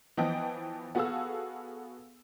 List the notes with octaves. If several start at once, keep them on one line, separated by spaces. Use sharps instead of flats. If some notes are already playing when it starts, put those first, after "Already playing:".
E3 F3 B3 D#5 G5 D#6
B3 F#4 G#4 A4 F5 E6